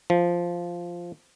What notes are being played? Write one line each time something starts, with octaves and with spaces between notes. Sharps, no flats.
F3